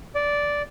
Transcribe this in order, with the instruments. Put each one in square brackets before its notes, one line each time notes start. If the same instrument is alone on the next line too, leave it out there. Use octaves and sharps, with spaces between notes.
[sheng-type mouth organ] D5